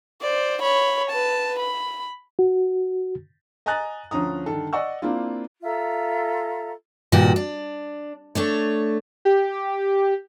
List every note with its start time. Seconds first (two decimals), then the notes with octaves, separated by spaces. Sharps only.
0.21 C5 D5
0.62 C#5 B5
1.10 B4 A5
1.59 B5
2.39 F#4
3.66 D#5 G#5 A#5 D#6 F#6 A6
4.11 D2 F3 C#4 A#5 D#6
4.46 G2 D3 D#3 A4
4.73 D5 D#5 F#5 C#6 E6
5.02 A#3 C4 D4 E4 F4
5.63 F4 A4 E5 A#5
7.12 G2 A#2 D#3 F#4
7.36 D4
8.35 A3 D4 C#5
9.25 G4